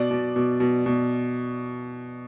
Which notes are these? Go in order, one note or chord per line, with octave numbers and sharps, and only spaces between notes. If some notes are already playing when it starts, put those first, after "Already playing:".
Already playing: B2 D5
B2
B2
B2
B2